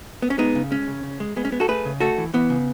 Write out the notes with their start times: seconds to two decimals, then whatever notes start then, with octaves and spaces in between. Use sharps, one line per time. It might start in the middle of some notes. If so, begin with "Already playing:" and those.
0.22 B3
0.30 C#4
0.38 G#3 B3 D#4
0.55 C#3
0.71 G#3 C#4
0.87 C#3
1.03 C#3
1.20 G#3
1.36 G#3 B3
1.45 C#4
1.52 G#3 B3
1.60 F#4 A4
1.68 A3 G#4 B4
1.85 C#3
2.00 A3 F#4 A4
2.18 E3
2.34 E3 B3
2.50 C#3